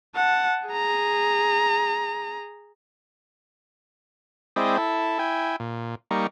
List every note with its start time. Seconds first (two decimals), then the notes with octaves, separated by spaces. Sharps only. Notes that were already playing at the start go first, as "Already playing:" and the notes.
0.15 F#5 A5
0.67 G#4 A#5
4.56 G#3 C4 E4 D5 D#5 G5
4.78 E4 A4
5.19 E4 G5 G#5
5.60 A#2
6.11 G3 A#3 D#4 C#6